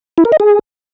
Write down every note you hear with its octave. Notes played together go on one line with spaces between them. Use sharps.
E4
A#4
D#5
G#4